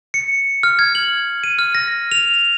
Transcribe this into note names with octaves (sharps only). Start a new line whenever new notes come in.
C#7
F6
G#6
F#7
D#7
F6
A#6
F7